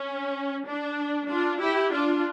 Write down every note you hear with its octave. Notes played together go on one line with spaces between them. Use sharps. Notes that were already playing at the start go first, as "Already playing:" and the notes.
Already playing: C#4
D4
D4 F4
E4 G4
D4 F4